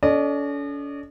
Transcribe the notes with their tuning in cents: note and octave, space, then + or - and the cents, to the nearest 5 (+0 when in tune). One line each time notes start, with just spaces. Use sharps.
C#4 +45 A4 -20 D#5 -40